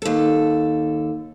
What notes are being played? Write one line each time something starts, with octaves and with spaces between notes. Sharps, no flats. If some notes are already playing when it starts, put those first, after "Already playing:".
D#2 A4